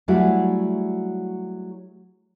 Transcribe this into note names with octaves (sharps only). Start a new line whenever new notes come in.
F#3 G3 A3 E4 F#4 G#4